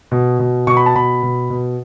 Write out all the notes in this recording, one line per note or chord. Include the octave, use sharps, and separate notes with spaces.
B2
B2
B2 C#6
B5
A5
B2 B5
B2
B2